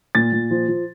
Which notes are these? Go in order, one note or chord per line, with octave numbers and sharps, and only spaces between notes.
A#2 A6
A#2
F3
F3